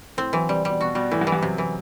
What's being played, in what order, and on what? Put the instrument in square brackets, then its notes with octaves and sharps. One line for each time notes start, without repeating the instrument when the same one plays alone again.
[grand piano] A2 [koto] C4
[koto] E3 [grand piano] F#3
[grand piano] C3 [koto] G3
[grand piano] B2 [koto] G3
[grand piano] B2 [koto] F#4
[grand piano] B2 [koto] G3
[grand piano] A2 [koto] E3
[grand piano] G2
[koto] E3
[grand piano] G2
[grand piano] F#2 [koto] C3
[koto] E3